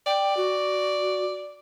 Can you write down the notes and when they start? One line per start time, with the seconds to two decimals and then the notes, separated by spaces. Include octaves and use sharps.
0.06 D5 G5
0.37 F#4